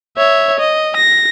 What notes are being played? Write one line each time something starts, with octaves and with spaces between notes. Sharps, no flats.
C#5 E5
D#5
A#6